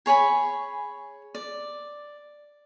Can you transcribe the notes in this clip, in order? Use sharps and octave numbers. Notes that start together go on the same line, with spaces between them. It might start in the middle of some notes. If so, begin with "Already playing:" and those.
G#4 C#5 G#5 B5
D5